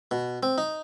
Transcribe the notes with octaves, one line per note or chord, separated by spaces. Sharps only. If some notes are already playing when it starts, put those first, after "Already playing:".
B2
C4
D#4